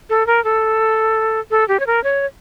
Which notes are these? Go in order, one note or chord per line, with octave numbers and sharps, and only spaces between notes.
A4
A#4
A4
A4
G4
C#5
A#4
C#5